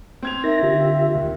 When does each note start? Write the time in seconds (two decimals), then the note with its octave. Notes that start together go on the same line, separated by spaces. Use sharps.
0.22 C4 G#6 F7
0.44 D#4 A#4 E5 A#6
0.63 D3 F4 G4
1.15 D#2